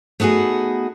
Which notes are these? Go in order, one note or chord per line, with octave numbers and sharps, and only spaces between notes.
A3 B3 D#4 F#4 G#4